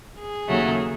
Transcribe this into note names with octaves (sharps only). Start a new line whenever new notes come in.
G#4
D#2 C#3 F#3 A3